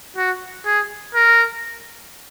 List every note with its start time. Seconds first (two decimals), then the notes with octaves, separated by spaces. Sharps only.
0.16 F#4
0.66 G#4
1.15 A#4